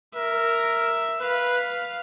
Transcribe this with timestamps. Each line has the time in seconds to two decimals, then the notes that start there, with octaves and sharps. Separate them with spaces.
0.15 A#4 E5
1.21 B4 F5